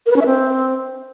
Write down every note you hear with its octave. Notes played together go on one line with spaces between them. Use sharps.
A#4
B4
C#4
E5
C4